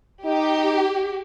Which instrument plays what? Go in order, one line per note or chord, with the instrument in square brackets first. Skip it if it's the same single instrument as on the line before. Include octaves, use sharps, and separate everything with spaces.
[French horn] D#4 [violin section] G4